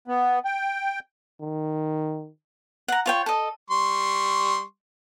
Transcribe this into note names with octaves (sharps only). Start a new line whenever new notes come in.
B3
G5
D#3
F#5 A#5
F4 C#5 G5
A4 D#5
G3 C6 C#6